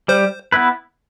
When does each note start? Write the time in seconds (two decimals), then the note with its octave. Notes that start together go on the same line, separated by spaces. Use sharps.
0.08 G3 C5
0.52 B3 E4 B4